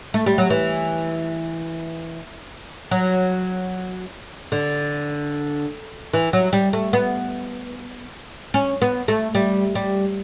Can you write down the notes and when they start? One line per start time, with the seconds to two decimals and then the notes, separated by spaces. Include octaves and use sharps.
0.14 A3
0.26 G3
0.38 F#3
0.50 E3
2.91 F#3
4.52 D3
6.13 E3
6.33 F#3
6.53 G3
6.73 A3
6.93 B3
8.54 C#4
8.82 B3
9.08 A3
9.35 G3
9.75 G3